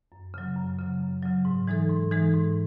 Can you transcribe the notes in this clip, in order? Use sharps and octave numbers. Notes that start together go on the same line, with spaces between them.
F#2
C#3 F#3
F#2
C#3 F#3
F#2
C#3 F#3
G#2
E3 G#3 D#4 A4
G#2
E3 G#3 D#4 A4
G#2